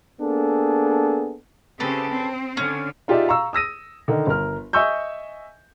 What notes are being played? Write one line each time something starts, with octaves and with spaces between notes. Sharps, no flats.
A#3 B3 D4 G#4 A4
C#3 C4 G4 A4 B4
C4
D3 C#4
D#4 F4 G4 G#4 D5 E5
F5 A#5 C#6 E6
D#6 E6 A#6 D#7
D3 D#3 D#4 A#4
G1 A#4 F6
D#5 E5 G#5 C#6 E6 G6